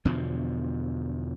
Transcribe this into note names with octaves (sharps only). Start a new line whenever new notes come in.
E2 B2 D3 F3